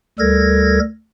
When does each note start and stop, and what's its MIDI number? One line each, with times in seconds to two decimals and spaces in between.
0.19 0.79 38
0.19 0.79 55
0.19 0.79 69
0.19 0.79 70
0.19 0.79 92
0.19 0.79 94